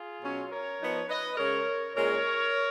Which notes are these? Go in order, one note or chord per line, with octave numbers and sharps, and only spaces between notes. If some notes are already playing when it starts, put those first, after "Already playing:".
Already playing: F4 G#4
B2 F#3 C#4
A#4 C#5
F3 B3 D#4
B4 D#5
C#3 G#3 C#4 A#4 C#5
A#2 G#3 C#4 A#4 C#5